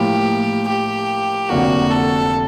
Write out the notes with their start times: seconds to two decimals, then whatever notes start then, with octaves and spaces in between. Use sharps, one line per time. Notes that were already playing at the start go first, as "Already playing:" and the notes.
Already playing: A2 F3 A#3 G4
0.68 G4
1.50 F1 F2 D3 F#3 A#3 F#4
1.91 A4